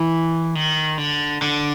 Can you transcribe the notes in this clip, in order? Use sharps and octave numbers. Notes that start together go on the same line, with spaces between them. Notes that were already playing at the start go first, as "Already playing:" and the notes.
Already playing: E3
D#3
D3
D3